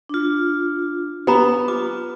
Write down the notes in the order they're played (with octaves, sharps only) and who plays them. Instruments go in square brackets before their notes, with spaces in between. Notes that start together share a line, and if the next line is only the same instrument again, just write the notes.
[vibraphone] D4 F4
[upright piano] B3 [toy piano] G4 A#5 B5
[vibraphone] F4 [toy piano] D6